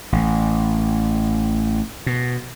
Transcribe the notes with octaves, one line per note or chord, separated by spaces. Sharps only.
A1
B2